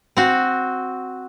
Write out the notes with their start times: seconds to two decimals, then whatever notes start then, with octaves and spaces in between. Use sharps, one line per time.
0.17 C4 F#4